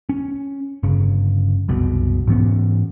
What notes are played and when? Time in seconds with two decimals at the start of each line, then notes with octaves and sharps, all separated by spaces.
0.09 C#4
0.83 G1 C#3
1.69 F#1 C2 B2
2.27 G#2 E3 B3 C#4